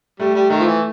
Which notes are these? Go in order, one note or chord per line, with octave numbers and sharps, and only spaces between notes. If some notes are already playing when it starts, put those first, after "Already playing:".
G3 A3
G3
D#3 A3
F3
E3